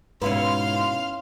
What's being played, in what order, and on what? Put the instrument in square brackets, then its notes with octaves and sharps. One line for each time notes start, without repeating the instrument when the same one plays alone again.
[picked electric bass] G#2 B2 [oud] C#4 E4 B4 [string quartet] F5 [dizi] C6